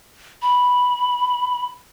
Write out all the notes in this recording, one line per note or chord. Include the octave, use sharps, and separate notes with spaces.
B5